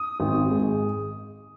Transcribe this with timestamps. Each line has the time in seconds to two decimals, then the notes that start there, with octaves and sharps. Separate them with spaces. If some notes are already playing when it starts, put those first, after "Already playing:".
Already playing: D#6
0.20 G#1
0.51 G#3